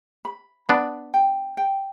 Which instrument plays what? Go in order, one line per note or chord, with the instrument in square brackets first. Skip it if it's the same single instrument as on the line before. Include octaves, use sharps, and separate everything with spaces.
[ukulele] B5
[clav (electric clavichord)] B3 D4 [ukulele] B5
[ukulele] G5
G5